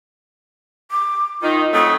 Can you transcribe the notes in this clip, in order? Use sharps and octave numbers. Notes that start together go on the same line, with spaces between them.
D6
D#3 D#4 F4
F2 F#3 A3 D#6